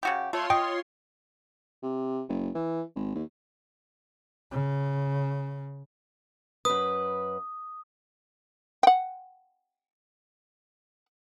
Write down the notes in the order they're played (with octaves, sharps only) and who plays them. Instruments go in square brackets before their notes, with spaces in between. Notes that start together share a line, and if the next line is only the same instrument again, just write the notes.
[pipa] C#3 F#4 G4
[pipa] A3 [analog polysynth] F4 C#5 C6
[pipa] D#5 [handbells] G5
[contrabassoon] C3
F#1
E3
G#1
D#2
[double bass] C#3
[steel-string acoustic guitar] F#2 B4 [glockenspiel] D#6
[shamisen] F#5 G5